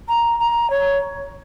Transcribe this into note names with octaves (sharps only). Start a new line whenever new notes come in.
A#5
A#5
C#5